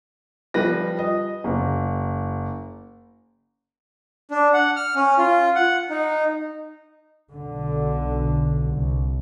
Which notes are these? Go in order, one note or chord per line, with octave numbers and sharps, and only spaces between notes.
F3 G3 B4 A#6
D#5
F#1
D4
F#5
F6
C#4
F4
F#5
D#4
B1 D3
C2